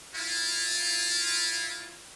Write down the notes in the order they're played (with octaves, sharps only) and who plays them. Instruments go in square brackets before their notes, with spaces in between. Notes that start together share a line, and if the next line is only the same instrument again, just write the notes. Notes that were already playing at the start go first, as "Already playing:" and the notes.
[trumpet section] E4 F4